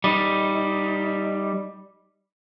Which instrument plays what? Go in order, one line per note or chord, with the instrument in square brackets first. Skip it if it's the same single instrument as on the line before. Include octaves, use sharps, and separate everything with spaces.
[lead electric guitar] G3 D#4